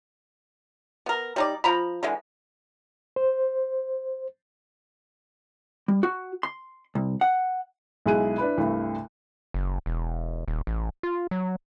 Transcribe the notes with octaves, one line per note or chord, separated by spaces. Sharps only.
B3 A#4
G3 D#4 D5
F3 A#5 B5
D3 E3 G#3
C5
G3
F#4
C6
C2
F#5
B1 G#3 E4 G#4 F#6 D#7
D4 E4 B4 B5
C2 G2 A3
F#1
E1
D#1
A1
F4
F#3